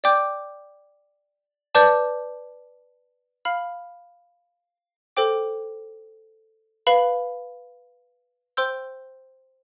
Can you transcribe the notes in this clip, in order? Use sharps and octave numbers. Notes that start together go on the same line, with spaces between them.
D5 G5 D6 G6
B4 D5 A5 D6 G6
F5 B5 F6
A4 C5 G5 D6
B4 F5 B5
C5 G5 C6 E6 G6